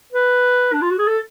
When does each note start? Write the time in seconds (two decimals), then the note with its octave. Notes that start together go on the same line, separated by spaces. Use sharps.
0.13 B4
0.73 D4
0.82 F4
0.91 F#4
0.99 G#4
1.07 A4